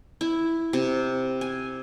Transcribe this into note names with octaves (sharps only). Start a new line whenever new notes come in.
E4
C3
G#5